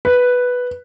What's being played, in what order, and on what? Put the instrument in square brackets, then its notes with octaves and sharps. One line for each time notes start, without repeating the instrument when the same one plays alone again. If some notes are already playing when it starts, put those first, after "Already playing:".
[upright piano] B4